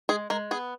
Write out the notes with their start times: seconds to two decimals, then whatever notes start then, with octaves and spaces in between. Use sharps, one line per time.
0.09 G#3 G#4
0.30 G#3 A#4
0.51 B3 G#4